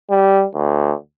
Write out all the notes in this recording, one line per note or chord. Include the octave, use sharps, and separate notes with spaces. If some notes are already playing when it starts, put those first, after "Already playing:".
G3
D2